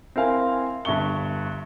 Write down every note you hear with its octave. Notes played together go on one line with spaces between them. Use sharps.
C4 E4 A#4 F5 G#5
G1 G2 E5 C#6 G7